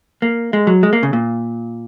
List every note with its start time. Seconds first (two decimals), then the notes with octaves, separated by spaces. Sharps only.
0.22 A#3
0.53 G#3
0.67 F#3
0.83 G#3
0.93 A#3
1.03 C#3
1.13 A#2